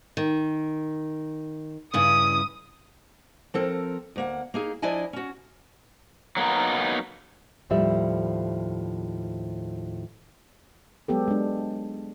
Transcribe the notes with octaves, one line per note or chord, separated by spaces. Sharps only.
D#3
G2 C#3 E4 D#6
F3 C4 A4 A#4
D2 A#3 F#5
A#3 D#4 G#4
F3 D4 E4 D5 D#5 G#5
C#4 F#4
F#3 A#3 B3 D#4
D#2 A2 F3 G3 E5
F#3 G#3 B3 G4 A4
G#3 D4